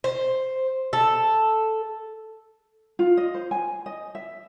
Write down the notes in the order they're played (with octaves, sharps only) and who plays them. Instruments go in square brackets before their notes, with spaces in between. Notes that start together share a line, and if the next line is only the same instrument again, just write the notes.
[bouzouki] C5
A4
[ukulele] F4
D#5
C5
G#5
D#5
E5